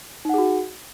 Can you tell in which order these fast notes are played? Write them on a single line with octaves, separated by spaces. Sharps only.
D#4 F#5 G#4 F#4